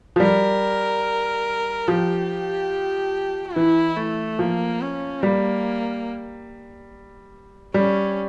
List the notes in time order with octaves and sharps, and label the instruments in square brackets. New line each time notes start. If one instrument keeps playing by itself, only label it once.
[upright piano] F3
[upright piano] G3 [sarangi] A#4
[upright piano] F3 [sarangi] G4
[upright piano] E3 [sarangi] E4
[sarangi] A3
[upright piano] F3 [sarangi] A#3
[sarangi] C#4
[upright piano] G3 [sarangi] A#3
[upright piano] G3 [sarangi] C#4